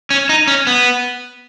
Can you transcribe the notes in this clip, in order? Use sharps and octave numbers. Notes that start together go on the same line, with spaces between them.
C#4
D#4
C#4
B3